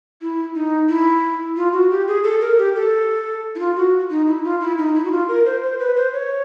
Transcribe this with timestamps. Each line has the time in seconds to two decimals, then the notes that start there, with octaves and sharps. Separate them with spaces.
0.21 E4
0.55 D#4
0.88 E4
1.57 F4
1.73 F#4
1.91 G4
2.08 G#4
2.24 A4
2.41 A#4
2.58 G4
2.75 A4
3.55 E4
3.59 F4
3.76 F#4
4.10 D#4
4.27 E4
4.44 F4
4.61 E4
4.78 D#4
4.95 E4
5.05 F#4
5.11 F4
5.28 A#4
5.45 C5
5.63 C5
5.79 B4
5.96 C5
6.13 C#5